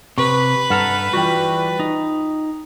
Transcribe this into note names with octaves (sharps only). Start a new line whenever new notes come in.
C3 B4 C#6
G2 A4 F#5 A#5 F6
E3 G3 F4 F#4 G5
D#4